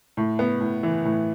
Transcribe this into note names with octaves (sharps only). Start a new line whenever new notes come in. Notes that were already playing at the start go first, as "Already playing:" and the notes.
A2
B3
A2
E3
A2